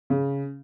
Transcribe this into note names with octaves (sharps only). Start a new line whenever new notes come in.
C#3